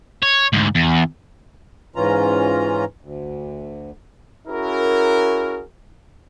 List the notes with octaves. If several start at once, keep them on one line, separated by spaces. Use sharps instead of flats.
C#5
D2 G#2
E2
G#2 E3 C#4 F4 A#5
D2
C#4 E4 F#4 G#4 A#4